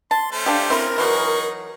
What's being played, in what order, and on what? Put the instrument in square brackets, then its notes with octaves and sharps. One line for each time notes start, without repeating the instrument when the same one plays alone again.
[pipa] A5 [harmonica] C6
[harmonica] A3 C#4 C5
[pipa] D4 G4 [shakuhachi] F5
[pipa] C4 E4 [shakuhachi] A#4
[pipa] E3 F#3 [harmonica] D#4 G#4 C#6